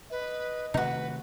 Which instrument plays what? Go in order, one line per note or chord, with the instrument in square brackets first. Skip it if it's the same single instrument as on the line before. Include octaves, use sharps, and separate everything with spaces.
[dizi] B4 [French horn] D#5
[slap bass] C3 D#3 A3 [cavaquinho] D#4 F#4 [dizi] B4